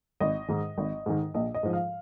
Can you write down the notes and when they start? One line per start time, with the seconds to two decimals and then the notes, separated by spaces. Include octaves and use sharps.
0.20 G#1 D#5
0.48 G#2 D#3
0.78 G#1
1.06 G#2 D#3
1.34 A#1 D#5
1.54 D#5
1.63 G#2 F3
1.73 F5